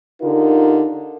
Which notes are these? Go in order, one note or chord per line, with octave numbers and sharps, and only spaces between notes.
D3 D#4 F4 G4 A#4